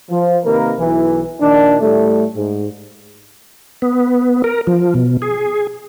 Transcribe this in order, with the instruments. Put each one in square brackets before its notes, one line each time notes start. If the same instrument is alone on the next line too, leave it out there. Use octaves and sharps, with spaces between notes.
[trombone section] F3
C3 D#3 A#3 A#4 B4
B1 E3
A#2 D#3 D4
A2 G3 A3
G#2
[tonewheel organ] B3
A#4
F3
B2
G#4